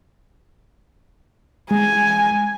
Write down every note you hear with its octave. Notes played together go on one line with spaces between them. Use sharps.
G#3 G#5